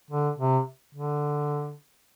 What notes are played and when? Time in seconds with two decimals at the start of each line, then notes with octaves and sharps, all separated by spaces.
0.11 D3
0.38 C3
0.95 D3